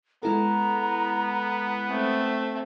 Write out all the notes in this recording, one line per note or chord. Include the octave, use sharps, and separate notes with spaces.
G#3 B3 E4 A4 A#5
A3 C4